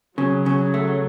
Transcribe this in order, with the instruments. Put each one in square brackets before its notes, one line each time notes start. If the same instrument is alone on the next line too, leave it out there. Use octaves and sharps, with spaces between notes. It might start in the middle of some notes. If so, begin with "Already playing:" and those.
[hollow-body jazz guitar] C#3 [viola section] F#3
[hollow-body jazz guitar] C#3
A3